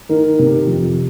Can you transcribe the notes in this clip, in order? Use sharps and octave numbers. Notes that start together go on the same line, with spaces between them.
D#3 A#4
C3
F2